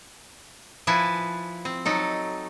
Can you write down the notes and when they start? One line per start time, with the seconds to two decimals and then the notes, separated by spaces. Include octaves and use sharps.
0.87 F3 E4 B4 G#5 A5
1.65 C4
1.85 F#3 D#4 A4